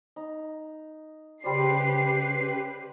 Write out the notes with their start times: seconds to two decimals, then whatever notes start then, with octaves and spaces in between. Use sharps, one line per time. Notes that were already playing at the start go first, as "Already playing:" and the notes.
0.16 D#4
1.44 C#3 G3 G4 B4 C5 D5 C7